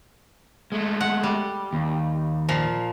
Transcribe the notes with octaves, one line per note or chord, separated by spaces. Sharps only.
G#3 A3
F#5
G3
D#2
A#2 F3